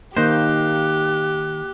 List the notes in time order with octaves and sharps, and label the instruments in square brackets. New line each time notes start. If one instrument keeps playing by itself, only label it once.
[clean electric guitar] D#3 D#4 C5 [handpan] A#3 [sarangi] G4 [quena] F#6